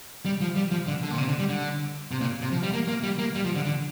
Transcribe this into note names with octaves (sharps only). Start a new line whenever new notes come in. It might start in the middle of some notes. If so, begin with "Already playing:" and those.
G3
F3
G3
F3
D3
D3
A#2
C3
D3
G3
D3
C3
A#2
C3
F3
G3
A#3
A#3
G3
A#3
G3
F3
D3
D3